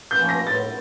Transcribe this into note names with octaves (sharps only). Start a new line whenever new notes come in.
G6
F3 A#3 C#4
A#6
A2 A6